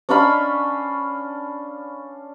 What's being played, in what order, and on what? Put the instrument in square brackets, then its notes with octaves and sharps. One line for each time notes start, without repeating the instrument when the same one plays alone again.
[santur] C#4 D4 F5 B5